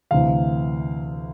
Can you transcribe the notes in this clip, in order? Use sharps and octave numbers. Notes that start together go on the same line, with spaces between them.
D2 C3 E3 F5